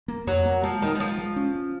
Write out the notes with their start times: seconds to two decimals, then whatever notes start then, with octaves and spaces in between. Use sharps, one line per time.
0.08 A#3
0.27 F2 F#3
0.45 A#3
0.63 F3 G#3
0.82 D#3 G#3
0.95 D#3
1.00 F3 G#3
1.19 G#3
1.36 C#4
1.55 C#4